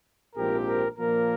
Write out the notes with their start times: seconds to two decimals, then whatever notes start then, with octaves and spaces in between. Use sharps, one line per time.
0.35 A#1 G#2 F3 C4 G4 A#4
0.66 A#4
0.98 A#1 A#2 F3 A#3 A#4